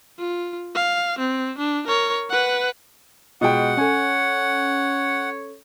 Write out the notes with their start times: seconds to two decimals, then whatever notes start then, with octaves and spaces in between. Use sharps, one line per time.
0.19 F4
0.75 F5
1.19 C4
1.58 D4
1.87 A#4 C#5
2.30 B4 F#5
3.41 B2 G#3 F4 F#5 G5
3.77 C#4 A4 C#5 G#5